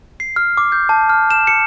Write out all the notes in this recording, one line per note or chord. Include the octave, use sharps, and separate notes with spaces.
C7
F6
D6
G6
A5
F6
E7
C#7